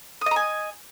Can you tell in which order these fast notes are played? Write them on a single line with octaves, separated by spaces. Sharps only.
D#6 D#5 A#5 G#5